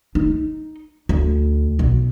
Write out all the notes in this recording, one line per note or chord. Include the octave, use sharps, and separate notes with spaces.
D#4
D2
B1